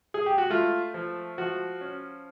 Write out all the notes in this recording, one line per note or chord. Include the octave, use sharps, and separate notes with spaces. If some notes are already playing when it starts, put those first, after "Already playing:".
G#4
G4
F#4
A3 F4
F3
F3 F#4
C#4